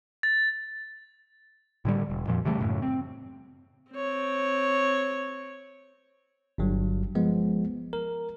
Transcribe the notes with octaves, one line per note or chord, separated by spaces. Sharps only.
A6
A2 D3 G3
E1
F2 A#2 F3
C#3 E3 G3 A3
F#2 A2 C#3
C4
C4 C#5
G1 G2 F#3
F3 G#3 B3
A#4